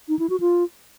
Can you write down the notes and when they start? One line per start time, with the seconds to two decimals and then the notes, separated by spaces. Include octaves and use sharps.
0.09 D#4
0.19 E4
0.30 F#4
0.40 F4